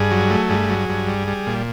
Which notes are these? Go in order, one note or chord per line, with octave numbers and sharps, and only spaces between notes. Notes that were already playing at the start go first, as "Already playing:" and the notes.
Already playing: G2 G#4
F#3
A3
G2 G#4
F#3
G2
G3
G3
A#2